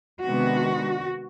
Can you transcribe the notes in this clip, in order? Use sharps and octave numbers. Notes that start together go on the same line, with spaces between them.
C3 D#3 G#3 B3 D4 F#4